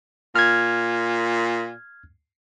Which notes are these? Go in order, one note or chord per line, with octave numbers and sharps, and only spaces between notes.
A#2 F6 G#6